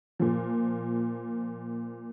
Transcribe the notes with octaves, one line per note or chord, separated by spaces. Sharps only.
A#2 F3